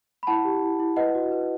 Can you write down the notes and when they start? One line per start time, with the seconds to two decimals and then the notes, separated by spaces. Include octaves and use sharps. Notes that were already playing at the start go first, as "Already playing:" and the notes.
0.23 B5
0.27 E4 F#5 A5
0.45 G4
0.62 E4
0.80 E4
0.97 B4 D#5 F#5
1.15 F#4
1.32 B4